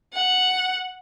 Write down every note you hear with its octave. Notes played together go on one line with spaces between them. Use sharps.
F#5